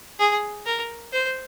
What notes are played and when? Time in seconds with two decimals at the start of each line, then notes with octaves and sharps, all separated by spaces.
0.19 G#4
0.66 A#4
1.13 C5